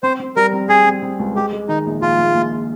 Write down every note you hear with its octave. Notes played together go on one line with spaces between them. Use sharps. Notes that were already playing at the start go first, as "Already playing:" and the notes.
C4 C5
C4
G3 A#4
C4
C4 G#4
C4
C4
C#2
G#3 G4
G#3
D#3 D#4
A#1
A#1 F4
A#1
A#1